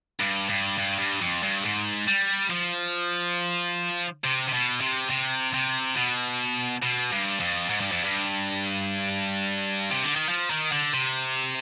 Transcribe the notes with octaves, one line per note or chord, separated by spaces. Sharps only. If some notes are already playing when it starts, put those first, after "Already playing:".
G2
G2
G2
G2
F2
G2
G#2
G3
F3
C3
C3
B2
C3
C3
C3
B2
B2
G2
F2
G#2
G2
F2
G2
C3
D3
D#3
F3
D#3
D3
C3